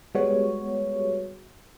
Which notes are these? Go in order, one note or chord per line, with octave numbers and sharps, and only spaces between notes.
G3 G#3 B3 F#4 C#5